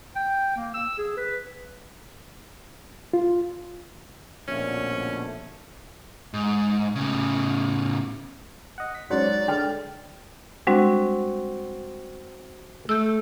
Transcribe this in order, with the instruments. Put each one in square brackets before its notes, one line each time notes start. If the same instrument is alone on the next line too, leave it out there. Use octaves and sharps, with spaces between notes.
[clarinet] G5
A#3
E6
G#4
B4
[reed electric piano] F4
[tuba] A#1 [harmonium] B2 D3 A3 [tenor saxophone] C#4
[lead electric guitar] G#2
A2 C#3
[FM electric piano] D#5 F#5
B6
[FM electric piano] G#2 C5 F#5 [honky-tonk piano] F#3 C#4 [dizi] D5
[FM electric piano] D3 G#3 [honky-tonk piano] G5 F6
[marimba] G3 G#3 D4 [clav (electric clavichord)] C4 F#4
[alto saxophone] A3 [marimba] E6 G6